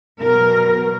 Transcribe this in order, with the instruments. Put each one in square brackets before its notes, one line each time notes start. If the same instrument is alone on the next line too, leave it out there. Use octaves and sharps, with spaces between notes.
[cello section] B2 F#3 A#4